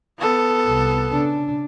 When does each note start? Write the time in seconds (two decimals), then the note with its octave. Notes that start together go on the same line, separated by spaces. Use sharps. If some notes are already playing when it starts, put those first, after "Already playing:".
0.18 B3 A4
0.66 C2
1.12 C#3 D4